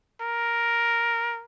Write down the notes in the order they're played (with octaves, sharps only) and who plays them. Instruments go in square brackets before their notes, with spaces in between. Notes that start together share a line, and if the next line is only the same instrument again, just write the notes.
[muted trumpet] A#4